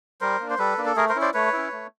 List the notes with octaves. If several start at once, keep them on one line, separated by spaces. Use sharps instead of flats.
G3 A#4 C5
A#3 D4
C5
G3 A4 B4
A#3 D4
A4
A3 G#4 A#4
A#4 C5
C#4 E4
C5 D5
A3 B4 C#5
C#4 E4
A3